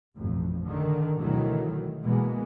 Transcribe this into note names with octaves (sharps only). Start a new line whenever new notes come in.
A1 F2 B2
D3 D#3
D2 B2 D#3 E3 F#3 A3
B2 E3 G#3 A#3 B3